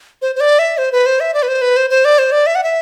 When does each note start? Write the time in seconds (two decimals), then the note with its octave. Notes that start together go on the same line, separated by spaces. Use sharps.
0.22 C5
0.36 C5
0.40 D5
0.59 E5
0.78 C5
0.92 B4
1.06 C5
1.20 E5
1.34 D5
1.43 B4
1.48 C5
1.62 B4
1.77 C5
1.90 C5
2.05 D5
2.18 C5
2.32 D5
2.46 E5
2.55 F#5
2.64 E5